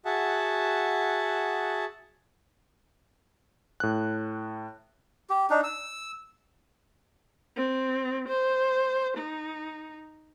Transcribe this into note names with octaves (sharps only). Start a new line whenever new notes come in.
F#4 G#4 E5 F#5 A5
A2 F#6
G4
D4 D#4
E6
C4
C5
D#4